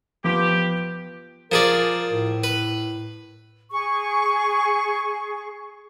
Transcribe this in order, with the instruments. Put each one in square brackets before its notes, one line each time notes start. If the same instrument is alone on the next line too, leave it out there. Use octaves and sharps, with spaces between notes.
[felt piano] F3 B3 [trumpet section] G4
[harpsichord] F3 G#4 D5 [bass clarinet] A#4
[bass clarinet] A2
[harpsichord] B4
[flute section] G#4 C#6